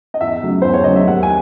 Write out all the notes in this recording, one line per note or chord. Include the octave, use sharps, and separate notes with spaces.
D#5
E2 E5
C#3 F#3 A3
E2 C5
C#5
C#3 F#3 A3 D#5
E5
D#2 F#5
G#5